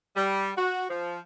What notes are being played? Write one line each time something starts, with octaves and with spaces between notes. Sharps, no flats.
G3
F#4
F3